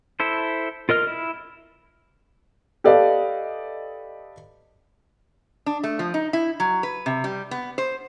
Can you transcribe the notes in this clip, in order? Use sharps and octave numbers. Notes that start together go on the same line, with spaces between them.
E4 A4 C5
F4 A#4 D#5 F6
E4
G4 A4 B4 D5 D#5 F5
D4
A3
F3
D#4
E4
F#3
B4
C3
G3
B3
C5